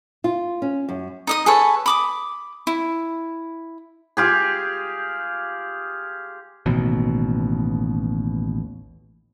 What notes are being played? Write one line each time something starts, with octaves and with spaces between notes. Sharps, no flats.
F4
C#4
F#2
D#4 D#5 D#6
G#4 A4 B4 C#5
B5 D6 D#6
E4
F4 G4 G#4
A1 D#2 B2